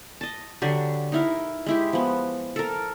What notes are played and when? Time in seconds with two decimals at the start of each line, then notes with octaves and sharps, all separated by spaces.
0.21 D#5 A5
0.62 D3 F#3 D4 G4
1.12 D#4 E4 A#4
1.66 G#3 E4 G4
1.93 F3 B3
2.56 A4 A#4